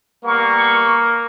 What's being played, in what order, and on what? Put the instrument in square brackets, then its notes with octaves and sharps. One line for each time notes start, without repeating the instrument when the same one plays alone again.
[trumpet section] G3 B3 C#6 [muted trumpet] A#3